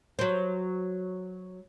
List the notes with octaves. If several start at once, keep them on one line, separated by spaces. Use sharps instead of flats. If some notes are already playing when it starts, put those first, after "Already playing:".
F#3 C5